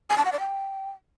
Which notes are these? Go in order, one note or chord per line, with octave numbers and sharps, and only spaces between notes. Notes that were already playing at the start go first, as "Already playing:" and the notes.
G#5
A5
F#5
D5
G5